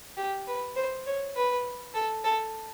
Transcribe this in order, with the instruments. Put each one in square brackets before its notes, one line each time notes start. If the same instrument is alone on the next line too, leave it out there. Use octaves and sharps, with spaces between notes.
[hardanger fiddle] G4
B4
C5
C#5
B4
A4
A4